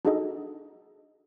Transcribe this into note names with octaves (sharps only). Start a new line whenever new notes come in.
D4 D#4 F#4 G#4 A4 D#5